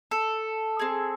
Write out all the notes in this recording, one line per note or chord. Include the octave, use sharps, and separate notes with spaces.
A4
C4 G#4